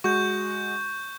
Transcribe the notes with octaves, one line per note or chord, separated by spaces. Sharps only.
G#3 F#4 C#6 G6